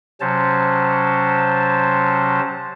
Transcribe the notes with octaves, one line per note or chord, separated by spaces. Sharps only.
C3 F#3 C#4 C5 A5